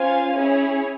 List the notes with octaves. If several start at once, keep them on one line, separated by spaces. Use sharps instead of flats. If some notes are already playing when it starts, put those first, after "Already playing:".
Already playing: C#4 F4 C5 F5 G#5
C#4 E4 G#4 C#5